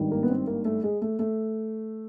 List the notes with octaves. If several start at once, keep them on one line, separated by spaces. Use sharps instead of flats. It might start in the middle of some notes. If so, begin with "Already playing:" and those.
Already playing: G#1 G2 D#3
A#3
B3
C4
A#3
A3
G#3
A3
A3